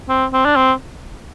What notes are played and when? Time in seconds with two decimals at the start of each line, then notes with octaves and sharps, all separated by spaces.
0.09 C4
0.33 C4
0.45 D4
0.56 C4